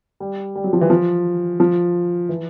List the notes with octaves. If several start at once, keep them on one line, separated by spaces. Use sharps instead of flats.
G3
G3
F#3
F3
E3
F3
F3
E3